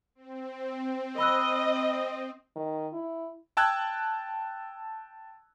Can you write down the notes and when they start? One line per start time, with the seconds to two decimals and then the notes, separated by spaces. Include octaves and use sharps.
0.15 C4
1.18 D#5 B5 E6 F#6
2.56 D#3
2.93 E4
3.57 G5 A5 E6 F#6 G#6